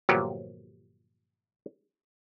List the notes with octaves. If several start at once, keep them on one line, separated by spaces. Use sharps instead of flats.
G1 A#2 F3 F#3 G4